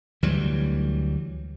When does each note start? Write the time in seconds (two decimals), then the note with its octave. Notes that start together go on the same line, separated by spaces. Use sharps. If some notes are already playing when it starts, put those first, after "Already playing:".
0.23 D2 E3 F#3 G3